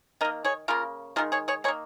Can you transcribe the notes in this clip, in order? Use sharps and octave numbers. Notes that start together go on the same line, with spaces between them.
D#3 A#3 A#4 D#5
G#4 C#5
C#3 A#3 F4 A#4
D#3 G#3 F4 A#4
G#4 C#5
G#4 C#5
D#3 A#3 G#4 C#5